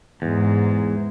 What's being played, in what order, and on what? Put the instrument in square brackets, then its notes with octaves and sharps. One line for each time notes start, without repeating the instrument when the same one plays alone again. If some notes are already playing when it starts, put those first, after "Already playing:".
[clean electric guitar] E2 [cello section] G#2 G#3